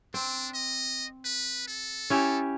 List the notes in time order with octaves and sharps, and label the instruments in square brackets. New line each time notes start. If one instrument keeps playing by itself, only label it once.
[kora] C4 [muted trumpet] D4
[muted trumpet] D#5
B4
A4
[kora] C#4 E4 G4